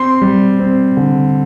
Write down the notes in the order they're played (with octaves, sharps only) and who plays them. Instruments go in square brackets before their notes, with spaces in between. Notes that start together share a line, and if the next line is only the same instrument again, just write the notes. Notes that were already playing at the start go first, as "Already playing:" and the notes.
Already playing: [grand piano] C4 C6
G3
C4
D3